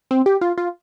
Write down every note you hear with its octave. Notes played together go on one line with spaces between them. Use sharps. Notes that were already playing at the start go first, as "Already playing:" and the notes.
C4
G4
F4
F4